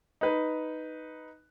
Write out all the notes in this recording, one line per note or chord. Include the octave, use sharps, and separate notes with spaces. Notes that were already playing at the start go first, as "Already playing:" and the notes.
D#4 B4